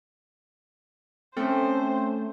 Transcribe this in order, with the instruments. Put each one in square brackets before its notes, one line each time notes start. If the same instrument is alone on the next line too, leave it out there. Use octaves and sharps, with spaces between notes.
[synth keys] A3 [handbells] C4 C#4 [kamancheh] C5